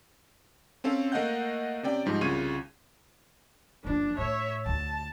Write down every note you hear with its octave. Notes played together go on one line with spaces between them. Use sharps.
C4 C#4 A4 F5
A3 A#3 D#5 F5 F#5 G6
C3 C#4 D5 G5
G#2 F3 G3 D#4
C2 C#3 F4 C#6 G#6 D#7
F#1 F3 D4
A2 C#5 E5
D2 A5